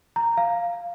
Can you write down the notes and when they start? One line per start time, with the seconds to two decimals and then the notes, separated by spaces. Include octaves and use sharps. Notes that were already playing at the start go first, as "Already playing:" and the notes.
0.16 A#5
0.37 F5